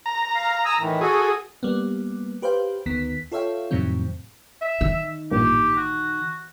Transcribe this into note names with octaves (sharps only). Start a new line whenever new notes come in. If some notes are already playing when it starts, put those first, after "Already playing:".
A#5
F5
G#5 D#6 E6
A2 D#3 E3
F#4 G#4 A4
G3 A#3 B3
G4 B4 C5 F5 G5
D2 D#3 B3 B6
F4 A4 C#5 E5 F5 G5
F2 A2 C3 D#3 F#3 C4
E5
D#3 E6
A1 G2 A#2 G4
F#4